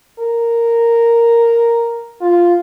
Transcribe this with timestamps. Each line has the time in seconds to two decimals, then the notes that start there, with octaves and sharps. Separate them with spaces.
0.19 A#4
2.21 F4